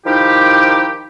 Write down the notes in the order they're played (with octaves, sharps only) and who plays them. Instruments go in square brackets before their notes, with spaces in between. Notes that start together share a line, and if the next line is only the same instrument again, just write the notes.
[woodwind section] D#3 F3 D#4 E4 G4